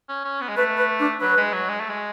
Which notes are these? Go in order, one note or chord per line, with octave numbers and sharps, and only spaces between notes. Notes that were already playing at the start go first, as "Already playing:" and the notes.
C#4
C#4
B3
G#3
A3 B4
B4
D4
F#3 B4
G#3
F#3
G#3
A3
G#3